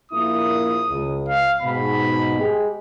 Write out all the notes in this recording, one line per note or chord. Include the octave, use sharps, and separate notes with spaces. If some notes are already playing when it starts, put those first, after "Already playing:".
A#1 A#3 E4 D#6
C#2
F5
G#2 B2 B5
G#3 G4